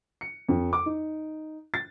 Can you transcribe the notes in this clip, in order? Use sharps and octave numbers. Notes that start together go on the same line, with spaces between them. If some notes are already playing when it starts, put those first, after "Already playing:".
C#7
F2
D6
D#4
A6